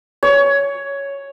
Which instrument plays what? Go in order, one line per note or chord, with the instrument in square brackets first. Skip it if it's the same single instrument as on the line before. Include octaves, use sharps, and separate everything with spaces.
[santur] C#5